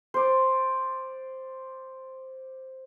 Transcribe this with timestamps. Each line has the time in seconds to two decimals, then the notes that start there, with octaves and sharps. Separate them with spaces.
0.14 C5 D5